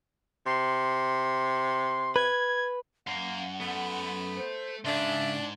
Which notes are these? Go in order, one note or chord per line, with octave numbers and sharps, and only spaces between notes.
C3 C6
B4 G#6
F#2 F5 F#5 A#5
A3 B3
C5
G#2 C#3 D4 E5